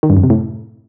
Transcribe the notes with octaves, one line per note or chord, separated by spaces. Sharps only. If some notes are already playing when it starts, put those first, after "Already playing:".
D#3
G2
F#2
C3
A2